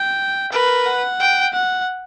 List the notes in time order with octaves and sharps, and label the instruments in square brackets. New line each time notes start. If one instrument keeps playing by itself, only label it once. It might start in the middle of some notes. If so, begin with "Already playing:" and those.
Already playing: [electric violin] G5
[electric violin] A#4 [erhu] B4
[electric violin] F#5
[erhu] G5
[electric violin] F#5